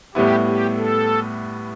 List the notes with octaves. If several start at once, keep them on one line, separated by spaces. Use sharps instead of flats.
A2 G3 B3 E4 G4
G4
A4